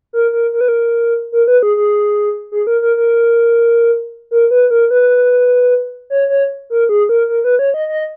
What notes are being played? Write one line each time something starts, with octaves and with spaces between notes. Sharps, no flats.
A#4
A#4
A#4
B4
A#4
A#4
B4
G#4
G#4
G#4
A#4
A#4
A#4
A#4
B4
A#4
B4
C#5
C#5
A#4
G#4
A#4
A#4
B4
C#5
D#5
D#5